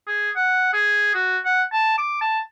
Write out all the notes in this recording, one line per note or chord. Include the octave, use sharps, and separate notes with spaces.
G#4
F#5
G#4
F#4
F#5
A5
D6
A5